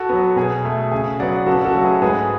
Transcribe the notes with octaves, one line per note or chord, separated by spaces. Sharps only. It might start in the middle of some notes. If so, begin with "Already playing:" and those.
Already playing: F#4 A4
F#3 B3
B2 G#4
A3
C#3 G#4
F#3 B3 D5 F#5
C#3 F#4 A4
F#4 A4
F#3 A3
G#4 B4
G#2 G#4 B4